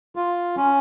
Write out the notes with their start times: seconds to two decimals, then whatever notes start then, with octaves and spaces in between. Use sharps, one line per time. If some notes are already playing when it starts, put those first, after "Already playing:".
0.16 F4
0.57 C#4